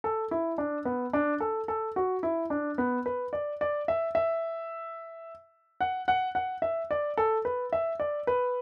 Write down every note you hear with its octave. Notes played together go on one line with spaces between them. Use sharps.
A4
E4
D4
B3
D4
A4
A4
F#4
E4
D4
B3
B4
D5
D5
E5
E5
F#5
F#5
F#5
E5
D5
A4
B4
E5
D5
B4